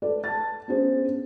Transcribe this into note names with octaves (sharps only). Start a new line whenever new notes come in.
A4 B4 D5
A5 A6
B3 C#4 D4 G#4 C5